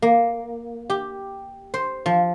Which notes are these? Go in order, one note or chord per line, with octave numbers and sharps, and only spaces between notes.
A#3
G4
C5
F3